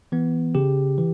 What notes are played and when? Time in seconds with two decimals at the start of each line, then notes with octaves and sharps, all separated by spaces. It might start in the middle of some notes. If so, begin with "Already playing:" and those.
0.12 E3 B3
0.55 C#3 G4
0.98 E3